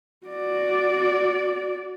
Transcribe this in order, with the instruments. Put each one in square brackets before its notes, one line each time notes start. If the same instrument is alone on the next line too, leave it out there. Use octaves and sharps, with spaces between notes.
[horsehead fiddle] F#4 D5